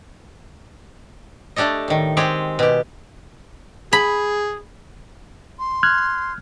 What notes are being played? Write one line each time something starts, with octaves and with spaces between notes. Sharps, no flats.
A3 D4 G4 A4 D#5
A2 D#3
G#3 C4 G4 G#4
B2 G4
G#4 B5
C6
F6 F#6 G#6